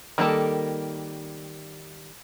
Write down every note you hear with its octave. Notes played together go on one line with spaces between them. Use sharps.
D#3 G3 A#3 A4